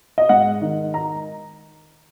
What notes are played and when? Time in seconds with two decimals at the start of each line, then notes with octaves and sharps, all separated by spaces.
0.18 D#5
0.29 G#2 F#5
0.61 D#3
0.94 A#5